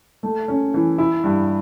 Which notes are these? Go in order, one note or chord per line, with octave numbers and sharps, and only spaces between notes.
A3
C#4
E3
E4
G2